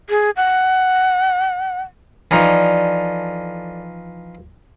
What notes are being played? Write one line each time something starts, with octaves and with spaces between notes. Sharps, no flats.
G#4
F#5
E3 F3 D#4 A4 D5